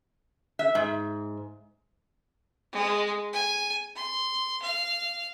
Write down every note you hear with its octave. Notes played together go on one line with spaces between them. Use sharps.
E5
G#2
G#3
G#5
C6
F5